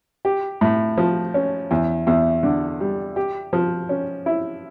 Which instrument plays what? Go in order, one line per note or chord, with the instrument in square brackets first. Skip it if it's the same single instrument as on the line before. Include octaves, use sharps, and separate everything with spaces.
[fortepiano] G4
A2
F3
C#4
E2
E2
D3
G3
G4
F3
C#4
E4